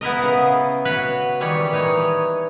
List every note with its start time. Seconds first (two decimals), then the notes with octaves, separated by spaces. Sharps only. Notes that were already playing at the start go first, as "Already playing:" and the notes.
0.01 B3 E4 A#4 D#5
0.23 C#3
0.85 F#4 B4 C#5
1.40 D#3 E3 G3 C#5
1.73 E3 D#4 C#5